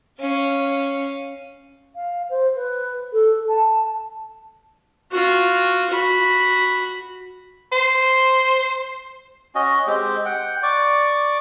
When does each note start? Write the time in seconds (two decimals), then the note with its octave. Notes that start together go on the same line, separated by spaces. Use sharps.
0.18 C#4 F5
1.95 F5
2.30 C5
2.56 B4
3.13 A4
3.48 A5
5.11 F4 F#4
5.90 F#4 B5
7.72 C5
9.55 C#4 F#4 D#5
9.87 G#3 C4 G4
10.25 F#5 G5
10.63 D5 C#6 D6